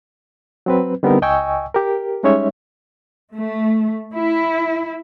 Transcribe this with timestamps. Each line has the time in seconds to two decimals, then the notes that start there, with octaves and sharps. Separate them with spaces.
0.66 F#3 C4 B4
1.03 D3 G3 B3 C4 D#4 A#4
1.22 C#2 D#5 G5 G#5 C#6 E6
1.74 G4 A#4
2.23 G3 G#3 C#4 D#4 C#5 E5
3.34 A3
4.14 E4